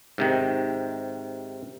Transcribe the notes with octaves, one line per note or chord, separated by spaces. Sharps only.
G#2 C3 D#3